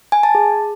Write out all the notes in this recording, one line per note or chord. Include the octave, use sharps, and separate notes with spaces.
G#5
A5
G#4